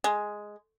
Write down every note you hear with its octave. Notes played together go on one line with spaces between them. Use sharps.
G#3